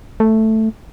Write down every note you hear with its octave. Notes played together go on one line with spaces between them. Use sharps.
A3